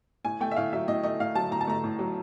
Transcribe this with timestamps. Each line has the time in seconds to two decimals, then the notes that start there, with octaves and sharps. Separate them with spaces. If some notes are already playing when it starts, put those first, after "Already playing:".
0.24 A2 G#5
0.41 A3 G5
0.51 E5
0.56 A2 F5
0.73 F#3 E5
0.88 A2 D#5
1.03 A3 D#5
1.20 A2 F5
1.35 F#3 A5
1.51 A2 A#5
1.61 A5
1.67 A3 A#5
1.83 A2
1.99 F#3